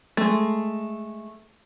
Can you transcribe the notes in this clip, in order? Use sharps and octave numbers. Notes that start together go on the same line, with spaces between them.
G#3 A3